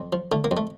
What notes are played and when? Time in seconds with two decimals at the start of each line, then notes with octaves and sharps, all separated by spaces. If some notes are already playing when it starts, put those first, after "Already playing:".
Already playing: F2
0.13 F3
0.32 D3 A3
0.44 A#3
0.51 F2
0.57 A3